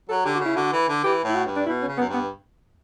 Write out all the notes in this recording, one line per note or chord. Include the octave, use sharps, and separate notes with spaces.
F#3 A4
D3 G4
C#3 F#4
E4
D3 F#4
E3
D3
E3 G4
A2
E4
F#4
G2
D4
B2 E4
C#4
C#3
F#2 B3
G2 B3